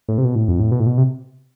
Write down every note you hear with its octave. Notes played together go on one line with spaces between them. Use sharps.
A2
C3
B2
A2
F2
A2
B2
A2
B2
C3